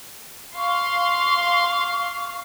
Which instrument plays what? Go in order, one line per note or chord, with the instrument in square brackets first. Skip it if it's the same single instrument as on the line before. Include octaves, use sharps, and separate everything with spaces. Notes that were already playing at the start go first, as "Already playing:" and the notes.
[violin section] F5 C6 [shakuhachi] C#6